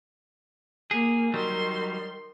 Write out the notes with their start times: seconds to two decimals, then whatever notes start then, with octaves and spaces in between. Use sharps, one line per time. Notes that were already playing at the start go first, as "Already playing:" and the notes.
0.91 A#3 G#4
1.34 D#3 F#3 G3 C6